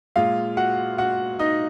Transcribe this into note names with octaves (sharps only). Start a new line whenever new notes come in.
A#2 G#3 F4 F5
F#4 F#5
F#4 F#5
D#4 D#5